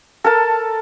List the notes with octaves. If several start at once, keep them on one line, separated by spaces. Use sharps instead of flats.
A4 A#4 A5